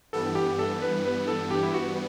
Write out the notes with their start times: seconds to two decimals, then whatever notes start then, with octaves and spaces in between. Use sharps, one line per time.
0.13 G2 E3 G3 B3 A4
0.35 G4
0.59 A4
0.82 B4
1.05 B4
1.28 A4
1.51 G4
1.63 E4
1.74 F#4